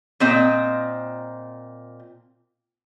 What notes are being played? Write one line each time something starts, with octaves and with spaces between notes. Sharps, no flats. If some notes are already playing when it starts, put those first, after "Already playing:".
A#2 C4 D#5